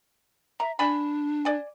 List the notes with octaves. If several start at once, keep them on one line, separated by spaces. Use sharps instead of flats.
E5 A#5
D4 D5 G#5 B5
D5 G#5